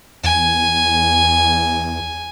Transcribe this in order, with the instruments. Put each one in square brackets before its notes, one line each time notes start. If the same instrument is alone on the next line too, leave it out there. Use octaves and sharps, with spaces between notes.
[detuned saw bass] E2 [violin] G#5